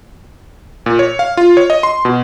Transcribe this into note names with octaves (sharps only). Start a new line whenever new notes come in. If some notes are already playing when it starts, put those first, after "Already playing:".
A#2
C#5
F5
F4
C#5
D#5
C6
B2